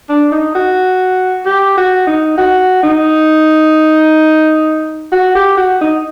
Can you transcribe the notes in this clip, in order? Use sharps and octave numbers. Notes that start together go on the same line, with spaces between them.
D4
D#4
F#4
G4
F#4
D#4
F#4
D#4
F#4
G4
F#4
D#4